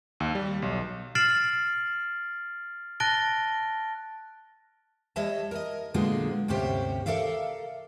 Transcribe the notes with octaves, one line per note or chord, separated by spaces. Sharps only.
D#2
G3
B1
F6 A6 C7 D7 E7 F#7
A5 F#6 A6 A#6 D7 G7
G3 C#5 D#5 E5 A5
A#4 D#5
A#2 D3 F#3 G#3 B3 F4
D2 G2 C3 C#4 G4 C5
A4 A#4 D5 E5 F5